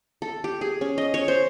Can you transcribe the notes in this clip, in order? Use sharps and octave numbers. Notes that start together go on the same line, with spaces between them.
A4
G4
G#4
C#4
D#5
C#5
C5